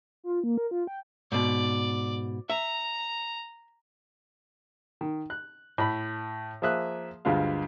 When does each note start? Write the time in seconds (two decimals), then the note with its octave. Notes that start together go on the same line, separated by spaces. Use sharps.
0.24 F4
0.44 A#3
0.58 A#4
0.71 F4
0.87 G5
1.32 G#2 B2 D5
2.50 E5 A#5
5.01 D#3
5.30 F#6
5.78 A2 B5
6.62 F3 A#3 G#4 E5 D#6 F#6
7.25 D2 G2 G#3 F4 F5